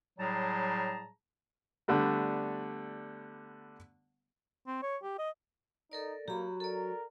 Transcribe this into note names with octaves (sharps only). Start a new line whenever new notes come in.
A2 F#3 G3 G#4 A5 A#5
D3 G3 A3 B3
C4
C#5
G4
D#5
D#4 A4 A#4 D5
F#3 A#3 G4 B5
A4 A#4 D5